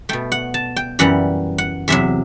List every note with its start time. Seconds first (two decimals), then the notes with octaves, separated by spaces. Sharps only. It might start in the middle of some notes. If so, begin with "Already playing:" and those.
0.09 B2 A3 G5
0.32 F#5
0.54 A5
0.76 G5
0.99 F#2 E3 G3 F#5
1.58 F#5
1.88 E2 C3 F#3 E5